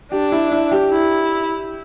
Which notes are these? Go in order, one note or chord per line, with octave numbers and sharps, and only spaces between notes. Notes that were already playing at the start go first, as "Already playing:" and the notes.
D4 G4
E4
E4
G4
E4